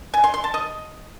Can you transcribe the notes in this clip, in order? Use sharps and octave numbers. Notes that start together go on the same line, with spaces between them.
G#5
C6
C6
A5
D#5